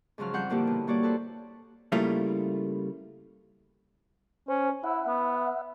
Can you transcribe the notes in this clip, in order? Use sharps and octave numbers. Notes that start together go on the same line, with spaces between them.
G#2 C#3 F3 F#3 F6
F2 G3 C5 F#5 G6
A#2 D3 F3 A#3 E4 G4
B2
G3 A#3 F#4 C#5 D5
A4 B4 C5
C#3 G3 A3 A#3 E4 F4
C#4 C5
E4 E5 F#5
B3